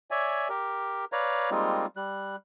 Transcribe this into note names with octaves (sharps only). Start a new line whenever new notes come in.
C#5 D5 E5 G#5
G4 A#4
B4 C#5 D5 F5 A#5
G3 G#3 A#3 C4 D#4 F4
G3 F#6